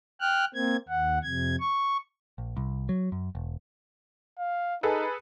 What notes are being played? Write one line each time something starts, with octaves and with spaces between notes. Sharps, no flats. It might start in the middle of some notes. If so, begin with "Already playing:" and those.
G5 F6 F#6
A#3 C4 G#6
D#2 F#5
F2 C3 G#6
C#6
A#1
C2
F#3
F#2
E1
F5
D#4 G#4 A4 B4